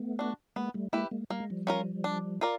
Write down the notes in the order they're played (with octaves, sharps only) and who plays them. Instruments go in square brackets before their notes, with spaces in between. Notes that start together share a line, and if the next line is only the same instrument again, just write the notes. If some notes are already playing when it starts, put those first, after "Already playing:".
Already playing: [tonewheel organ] A3 B3
[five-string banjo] D4 F#4
[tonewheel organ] G#3 A#3 [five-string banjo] B3
[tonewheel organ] G3 A3
[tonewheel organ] G#3 A#3 [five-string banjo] E4 G4 B4
[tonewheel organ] G#3 A#3
[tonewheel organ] G3 [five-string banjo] A#3
[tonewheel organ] G#3
F3 G3
[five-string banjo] C#4 F4 A#4
D4
F4 A#4 D5